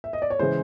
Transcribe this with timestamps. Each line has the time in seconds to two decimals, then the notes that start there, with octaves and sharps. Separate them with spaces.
0.04 E5
0.13 D#5
0.22 D5
0.30 C#5
0.39 C#3 E3 G#3 C5